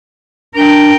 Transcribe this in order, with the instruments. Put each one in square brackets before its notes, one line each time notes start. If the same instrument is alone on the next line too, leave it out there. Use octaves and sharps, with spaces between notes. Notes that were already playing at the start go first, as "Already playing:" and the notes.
[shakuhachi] D4 [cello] A#4 G5